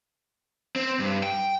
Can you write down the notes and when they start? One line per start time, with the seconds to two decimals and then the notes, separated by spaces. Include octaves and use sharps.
0.76 C4
1.00 G2
1.23 G5